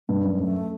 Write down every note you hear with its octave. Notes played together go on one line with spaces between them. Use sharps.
G2 G3
F#2
F#2 A3